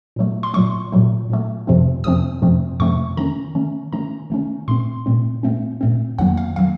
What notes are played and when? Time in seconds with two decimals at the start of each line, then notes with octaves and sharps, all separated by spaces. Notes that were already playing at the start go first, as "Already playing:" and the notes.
0.16 A#2 F#3 A3
0.43 C6
0.54 A#2 F#3 A3 C#6
0.92 A#2 F#3 A3
1.30 A#2 F#3 A3
1.67 F2 C3 F3 A3 C4
2.04 F2 C3 F3 A3 C4 D#6
2.42 F2 C3 F3 A3 C4
2.80 F2 C3 F3 A3 C4 C#6
3.17 D#3 A3 C#4 A#5
3.55 D#3 A3 C#4
3.93 D#3 A3 C#4 A#5
4.30 D#3 A3 C#4
4.68 A#2 A3 C4 C6
5.06 A#2 A3 C4
5.43 A#2 A3 C4
5.81 A#2 A3 C4
6.19 F2 D#3 F#3 A#3 F#5
6.37 F5
6.56 D#3 F#3 A#3 F5